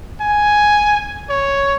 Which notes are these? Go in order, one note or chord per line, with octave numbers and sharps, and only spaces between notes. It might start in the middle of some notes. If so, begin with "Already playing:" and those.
G#5
C#5